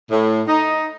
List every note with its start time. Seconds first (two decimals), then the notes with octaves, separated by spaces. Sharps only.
0.10 A2
0.48 D#4